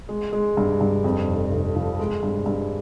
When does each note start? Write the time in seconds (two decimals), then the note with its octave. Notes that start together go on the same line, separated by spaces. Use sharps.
0.09 G#3
0.33 G#3
0.57 G2
0.81 G2
1.04 F2
1.28 F1
1.52 F1
1.76 F3
1.99 G#3
2.23 G2
2.46 G2